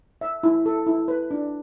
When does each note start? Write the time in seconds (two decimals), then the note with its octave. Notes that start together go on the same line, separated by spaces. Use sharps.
0.21 E5
0.43 E4
0.66 A4
0.86 E4
1.08 B4
1.31 D4